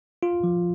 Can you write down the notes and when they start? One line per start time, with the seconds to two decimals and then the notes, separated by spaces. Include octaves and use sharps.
0.23 F4
0.44 F3